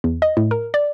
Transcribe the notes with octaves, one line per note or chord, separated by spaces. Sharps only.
E2
D#5
A2
A#4
D5